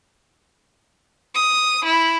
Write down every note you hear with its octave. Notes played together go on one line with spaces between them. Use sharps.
D#6
E4